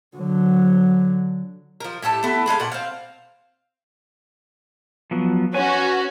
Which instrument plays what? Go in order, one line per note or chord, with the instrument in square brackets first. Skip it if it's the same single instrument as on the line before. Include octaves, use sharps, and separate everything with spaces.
[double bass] D3 F#3
[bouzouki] F3 A#4
A2 G4 A4 A5
A3 B3 E4 A4
G#3 G#4 A4 F5
A#2 F#5
C4 F5
[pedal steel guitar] F3 F#3 B3
[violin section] C#4 F#4 [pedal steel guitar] B4 G#5